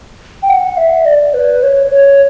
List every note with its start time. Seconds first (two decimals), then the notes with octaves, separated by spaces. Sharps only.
0.42 G5
0.49 F#5
0.77 E5
1.05 D5
1.34 B4
1.63 C#5
1.91 C#5